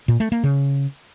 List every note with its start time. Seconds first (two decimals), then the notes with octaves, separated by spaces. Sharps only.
0.08 A#2
0.20 A3
0.32 A#3
0.44 C#3